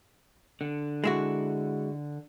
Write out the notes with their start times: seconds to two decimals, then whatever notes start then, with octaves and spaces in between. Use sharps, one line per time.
0.61 D3
1.04 G#3 E4 F#4